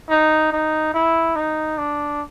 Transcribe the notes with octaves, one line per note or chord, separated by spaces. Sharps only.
D#4
D#4
E4
D#4
D4